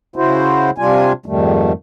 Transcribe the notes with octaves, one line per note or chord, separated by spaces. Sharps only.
C#3 E4 F#4 C5
C3 G3 D4 F4 G#5
F2 G#2 D#3 G3 A3